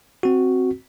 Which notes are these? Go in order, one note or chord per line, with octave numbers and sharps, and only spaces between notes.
C4 F#4